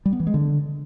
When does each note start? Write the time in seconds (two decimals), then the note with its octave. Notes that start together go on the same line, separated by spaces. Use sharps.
0.06 G3
0.13 B3
0.20 E3
0.27 G#3
0.34 D3